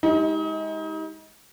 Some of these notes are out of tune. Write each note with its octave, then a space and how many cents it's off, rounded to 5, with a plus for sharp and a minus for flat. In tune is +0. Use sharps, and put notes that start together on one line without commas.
G#3 +0 D#4 +35 G4 +0